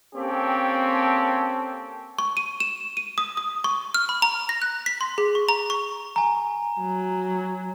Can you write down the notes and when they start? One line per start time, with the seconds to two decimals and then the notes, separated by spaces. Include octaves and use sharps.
0.15 A#3 C4 C#4 G4 A4
2.18 C#6
2.37 D#7
2.60 E7
2.97 D#7
3.18 D#6
3.37 D#6
3.64 C#6
3.94 F6
4.09 B5
4.22 A#5
4.49 A#6
4.62 F#6
4.86 B6
5.01 C6
5.18 G#4
5.35 C#6
5.49 A#5
5.70 C#6
6.16 G#5 A#5
6.81 F#3